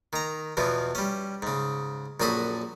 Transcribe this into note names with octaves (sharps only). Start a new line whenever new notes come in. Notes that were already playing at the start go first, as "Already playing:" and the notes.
D#3 A#5
E2 B2 E3 F3
G3 C#4
G#2 C#3
A#1 F#2 F#4 G#4 A4 B5